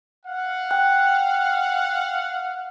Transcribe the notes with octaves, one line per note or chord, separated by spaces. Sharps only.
F5 F#5
G5 F#6